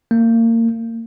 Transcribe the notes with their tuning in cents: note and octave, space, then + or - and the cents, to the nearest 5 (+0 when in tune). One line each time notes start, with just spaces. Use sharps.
A#3 -30